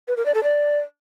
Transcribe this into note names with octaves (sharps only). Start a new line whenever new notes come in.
B4
A#4
D5
A4
D5